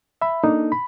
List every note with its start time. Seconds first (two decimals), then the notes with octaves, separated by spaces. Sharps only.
0.21 E5 B5
0.44 A#3 D4 D#4 A4
0.72 B5